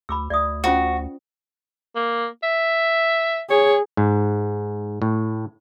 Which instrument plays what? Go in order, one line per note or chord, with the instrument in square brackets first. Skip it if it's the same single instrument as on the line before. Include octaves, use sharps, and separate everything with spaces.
[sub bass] D2 [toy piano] B5 D6 E6
[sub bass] D2 [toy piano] D5 E5 D#6
[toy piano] C#4 F4 C5 [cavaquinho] F#4
[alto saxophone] A#3
E5
[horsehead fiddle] G#4 [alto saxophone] C#5
[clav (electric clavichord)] G#2
A2